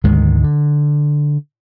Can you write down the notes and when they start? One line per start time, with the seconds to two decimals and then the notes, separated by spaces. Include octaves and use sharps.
0.04 D2 G#2 D#3 G#3
0.43 D3